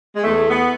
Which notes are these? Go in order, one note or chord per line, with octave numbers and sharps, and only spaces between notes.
G#3
E2 A3
B3